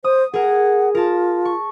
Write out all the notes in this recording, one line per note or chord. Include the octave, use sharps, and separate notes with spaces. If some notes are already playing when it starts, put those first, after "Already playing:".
C5 D#6
G#4 A#4 F#5
F4 A#4 A5
C#6